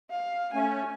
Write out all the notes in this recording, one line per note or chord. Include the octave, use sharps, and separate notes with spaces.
F5
A3 C#4 G#5